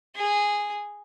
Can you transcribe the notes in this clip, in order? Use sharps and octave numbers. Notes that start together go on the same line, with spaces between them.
G#4